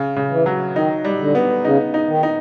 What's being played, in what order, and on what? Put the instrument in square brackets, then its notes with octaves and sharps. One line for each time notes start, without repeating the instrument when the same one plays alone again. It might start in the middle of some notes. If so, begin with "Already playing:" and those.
Already playing: [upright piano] C#3
C#3
[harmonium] E3
[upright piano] F#3
[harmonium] D#3 [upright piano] D#4
[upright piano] G3
[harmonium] D3
[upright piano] B3
[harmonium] C#3 [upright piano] D#4
[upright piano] D#4
[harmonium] D#3
[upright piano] D#4